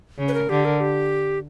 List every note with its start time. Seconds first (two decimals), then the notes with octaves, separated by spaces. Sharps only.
0.18 C#3
0.28 B4
0.34 A#4
0.49 D3 G4
0.65 A#4
0.80 G4